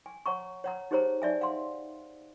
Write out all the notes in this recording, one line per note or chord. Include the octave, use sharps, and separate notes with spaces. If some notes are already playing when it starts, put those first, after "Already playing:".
G#5
C#5 F#5 A#5 C#6
C#5 F#5 A#5
D#4 G4 G#4 C5 C#5 A#5
D#4 D5 E5 G#5
F5 F#5 C6